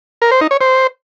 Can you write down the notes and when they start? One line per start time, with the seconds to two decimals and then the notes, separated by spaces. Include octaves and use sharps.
0.22 A#4
0.31 C5
0.41 D#4
0.51 C#5
0.61 C5